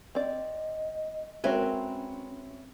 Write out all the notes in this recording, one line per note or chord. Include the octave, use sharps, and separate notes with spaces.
C4 D5 D#5
G#3 C4 C#4 F#4 A#4 B4 C#5 E5